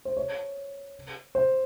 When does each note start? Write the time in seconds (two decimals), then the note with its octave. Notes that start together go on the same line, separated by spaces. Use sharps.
0.05 C5
0.17 C#5
1.35 C5